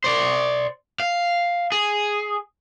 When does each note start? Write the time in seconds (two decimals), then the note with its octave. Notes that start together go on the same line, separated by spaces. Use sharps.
0.04 C5 D5
1.00 F5
1.72 G#4